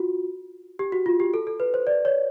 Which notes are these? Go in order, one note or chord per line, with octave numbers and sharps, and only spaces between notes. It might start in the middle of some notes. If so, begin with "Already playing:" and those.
Already playing: F4 F#4
G4
F#4
F4
G4
A4
A4
B4
C5
D5
C#5